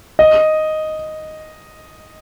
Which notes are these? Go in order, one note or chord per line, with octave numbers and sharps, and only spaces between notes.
D#5